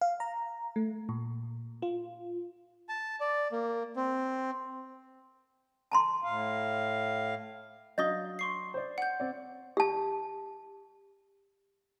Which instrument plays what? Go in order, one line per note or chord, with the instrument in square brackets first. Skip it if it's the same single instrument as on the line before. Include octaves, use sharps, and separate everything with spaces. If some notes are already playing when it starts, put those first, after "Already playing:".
[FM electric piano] F5
A#5
A3
A#2
F4
[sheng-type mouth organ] A5
D5
A#3
C4
[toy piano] A5 A#5 C6
[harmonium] A2 F5
[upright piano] F#3 D4 F5 [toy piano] D#5 D#6 [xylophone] G6 A#6 G7
[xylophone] C6 C#6 C7
[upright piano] C5 D5
[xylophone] F#5 G6
[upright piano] C4 D5
[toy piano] G4 A5